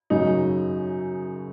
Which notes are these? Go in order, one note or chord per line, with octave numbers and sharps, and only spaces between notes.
F#2 C#3 F#3 D#4